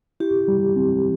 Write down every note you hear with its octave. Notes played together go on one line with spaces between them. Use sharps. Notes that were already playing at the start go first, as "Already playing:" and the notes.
E4 G4
G3
C4